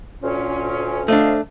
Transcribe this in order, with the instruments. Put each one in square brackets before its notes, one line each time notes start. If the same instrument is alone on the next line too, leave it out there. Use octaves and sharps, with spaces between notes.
[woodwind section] D2 A#2 C#4
[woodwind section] F3 D#5 F5 [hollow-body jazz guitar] A3 D4